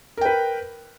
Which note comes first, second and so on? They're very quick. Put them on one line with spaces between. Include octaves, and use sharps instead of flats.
A#4 G5 B4